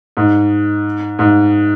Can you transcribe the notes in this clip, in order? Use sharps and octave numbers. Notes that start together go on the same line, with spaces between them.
G#2
G#2